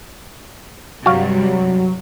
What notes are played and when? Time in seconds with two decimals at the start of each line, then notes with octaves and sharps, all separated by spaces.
1.06 G2 C3 F#3 G3 F#4 F5